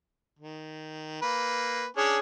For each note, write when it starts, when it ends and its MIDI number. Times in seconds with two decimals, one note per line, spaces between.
0.39 1.18 51
1.22 1.86 58
1.22 1.86 71
1.97 2.18 61
1.97 2.18 62
1.97 2.19 68
1.97 2.19 73